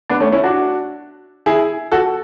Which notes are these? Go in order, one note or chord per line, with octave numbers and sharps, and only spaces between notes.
B3 D4
A3 C#4
C#4 E4
D4 F#4
E4 G#4
F#4 A4